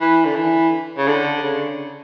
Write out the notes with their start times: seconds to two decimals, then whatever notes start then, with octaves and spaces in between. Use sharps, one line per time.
0.01 E3
0.26 D3
0.36 E3
0.98 C#3
1.08 D3
1.44 C#3